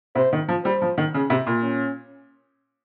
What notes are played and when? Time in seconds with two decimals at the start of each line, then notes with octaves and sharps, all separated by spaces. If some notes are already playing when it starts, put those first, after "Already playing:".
0.15 C3 C5
0.33 D#3
0.49 F3
0.65 G3 C5
0.82 F3
0.98 D#3
1.14 C#3
1.30 C3
1.47 A#2
1.63 C#4